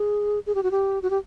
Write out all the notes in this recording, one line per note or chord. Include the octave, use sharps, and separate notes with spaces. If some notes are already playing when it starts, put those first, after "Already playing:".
Already playing: G#4
G#4
G4
F#4
G4
F#4
G4